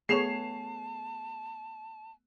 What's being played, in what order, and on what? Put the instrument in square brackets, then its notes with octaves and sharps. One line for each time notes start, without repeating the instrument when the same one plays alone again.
[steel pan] A3 B3 C#5 [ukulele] G#4 [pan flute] A5 [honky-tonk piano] C7 E7 F7